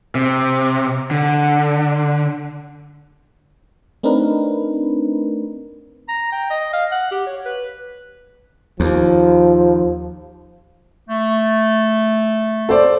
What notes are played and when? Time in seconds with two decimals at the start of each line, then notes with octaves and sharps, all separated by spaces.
0.15 C3
1.11 D3
4.03 A3 C4 D4 D#4 A#4 B4
6.08 A#5
6.32 G5
6.50 D#5
6.73 F5
6.91 F#5
7.11 G4
7.26 C#5
7.45 B4
8.80 D#2 F3
11.09 A3
12.69 A4 C5 D5